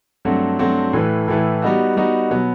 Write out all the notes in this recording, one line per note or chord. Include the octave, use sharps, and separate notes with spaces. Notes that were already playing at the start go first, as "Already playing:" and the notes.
G2 F#3 A3 C4 F#4
G2 F#3 A3 C4 F#4
A2 E3 A3 E4 B4
A2 E3 A3 E4 B4
G3 B3 D#4 F#4
G3 B3 D#4 F#4
B2 F#3 B3